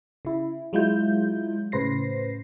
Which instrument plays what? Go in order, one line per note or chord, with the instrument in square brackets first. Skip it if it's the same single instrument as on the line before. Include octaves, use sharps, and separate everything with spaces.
[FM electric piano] C#3 E4
F#3 G#3 E4 F4 G6
A2 C#3 B4 C5 A#6 C7